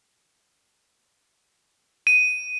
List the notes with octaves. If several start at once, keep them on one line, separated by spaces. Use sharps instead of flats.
D#7